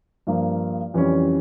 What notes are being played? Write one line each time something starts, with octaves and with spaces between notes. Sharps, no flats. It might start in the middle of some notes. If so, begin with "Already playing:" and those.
G2 F3 A#3
F2 E3 G3 C#4